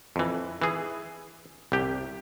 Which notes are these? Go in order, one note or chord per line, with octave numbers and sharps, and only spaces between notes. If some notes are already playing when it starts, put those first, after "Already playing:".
F2 E3
E3 G#4
C2 G4